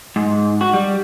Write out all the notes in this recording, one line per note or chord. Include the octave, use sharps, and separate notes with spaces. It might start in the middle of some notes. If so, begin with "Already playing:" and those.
G#2
F#4
G3